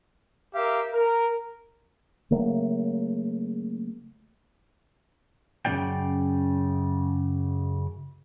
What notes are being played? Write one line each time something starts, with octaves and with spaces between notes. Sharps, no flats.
G4 A#4 E5 F5
A#4
C#3 F#3 A3 A#3
F#2 C#3 G#3 D#4 D5 G5